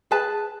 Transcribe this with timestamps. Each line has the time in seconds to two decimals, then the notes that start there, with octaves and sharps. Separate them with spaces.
0.11 G#4 B4 A5